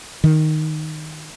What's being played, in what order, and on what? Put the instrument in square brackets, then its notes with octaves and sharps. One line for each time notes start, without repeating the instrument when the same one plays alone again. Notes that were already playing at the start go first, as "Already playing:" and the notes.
[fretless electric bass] D#3